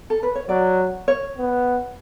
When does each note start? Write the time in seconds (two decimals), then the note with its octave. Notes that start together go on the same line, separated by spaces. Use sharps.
0.10 A4
0.23 B4
0.35 C#5
0.49 F#3 D5
1.08 C#5
1.38 B3